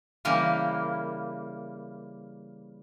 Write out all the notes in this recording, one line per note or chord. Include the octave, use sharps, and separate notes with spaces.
C#3 E3 G3 A#3